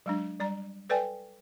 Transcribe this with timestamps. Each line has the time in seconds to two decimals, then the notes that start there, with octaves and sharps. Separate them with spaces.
0.06 F#3 G#3 D4
0.40 G3 D5 A#5
0.90 A4 B4 D5 G5 G#5